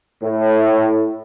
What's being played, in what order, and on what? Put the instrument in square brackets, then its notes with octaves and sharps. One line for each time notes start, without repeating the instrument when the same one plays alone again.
[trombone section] A2